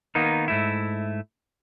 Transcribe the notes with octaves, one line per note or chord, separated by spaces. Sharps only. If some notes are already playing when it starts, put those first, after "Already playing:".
D#3 A#3 B3 D#4
G#2 A3 E4